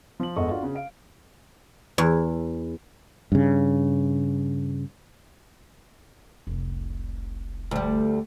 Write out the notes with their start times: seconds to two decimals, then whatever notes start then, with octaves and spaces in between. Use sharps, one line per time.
0.20 F3 F#7
0.37 G1 E2 G#3 A4 D#5 C#6
0.50 D4 F4 F#4
0.63 C#3
0.75 F5 D7
1.98 E2
3.32 G2 C#3
6.47 F1 C2
7.71 D2 G3